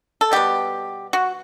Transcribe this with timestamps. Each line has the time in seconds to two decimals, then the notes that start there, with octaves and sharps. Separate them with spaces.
0.21 A4
0.32 B2 G3 B3 G4
1.13 F#4